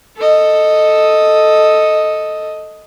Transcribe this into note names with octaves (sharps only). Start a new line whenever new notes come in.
A4 D#5